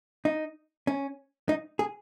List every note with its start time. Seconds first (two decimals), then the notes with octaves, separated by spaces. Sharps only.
0.25 D#4
0.87 C#4
1.49 D#4
1.79 G#4